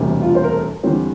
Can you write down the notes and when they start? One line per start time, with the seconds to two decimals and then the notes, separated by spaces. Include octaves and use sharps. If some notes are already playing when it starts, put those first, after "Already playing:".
Already playing: E1 D2 C3 G3
0.22 F4
0.35 C5
0.44 A#4
0.52 A4
0.83 E2 D3 G3 C4 C5